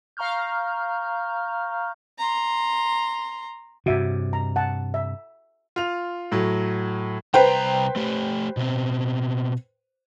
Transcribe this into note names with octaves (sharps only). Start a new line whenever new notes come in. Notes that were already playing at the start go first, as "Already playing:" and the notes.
F5 A#5 C#6 F6 G6
A#5 C6
G2 C3 F#4 E5
A#5
F#5 A5
E5
F4 F7
A2 F#3
C2 B4 C5 G5 A#5
A3 G4
B2 C4